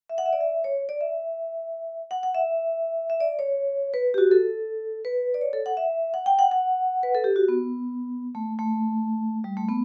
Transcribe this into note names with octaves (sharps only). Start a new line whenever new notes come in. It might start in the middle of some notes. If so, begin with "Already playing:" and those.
E5
F#5
E5
D5
E5
C#5
D5
E5
F#5
F#5
E5
E5
D5
C#5
B4
G4
F#4
A4
B4
D5
C#5
A4
F#5
E5
F#5
G5
F#5
F#5
B4
A4
G4
F#4
B3
A3
A3
G3
A3
B3